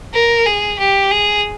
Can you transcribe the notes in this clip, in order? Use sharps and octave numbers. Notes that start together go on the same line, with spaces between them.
A#4
G#4
G4
G#4